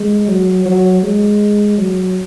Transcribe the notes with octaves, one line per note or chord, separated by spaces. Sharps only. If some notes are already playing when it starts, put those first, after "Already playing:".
Already playing: G#3
F#3
F#3
G#3
F#3